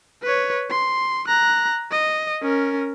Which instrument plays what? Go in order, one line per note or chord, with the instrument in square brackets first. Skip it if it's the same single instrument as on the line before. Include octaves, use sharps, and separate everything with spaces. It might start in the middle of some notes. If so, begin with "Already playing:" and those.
[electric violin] B4 C#5
C6
A#5 F#6
D#5
C#4 A#4